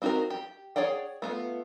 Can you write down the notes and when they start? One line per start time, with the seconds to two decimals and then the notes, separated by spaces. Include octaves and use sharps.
0.02 C4 D#4 F#4 G4 A#4
0.30 G4
0.76 G#4 C#5 D5 F#5 G5
1.22 A3 B3 F4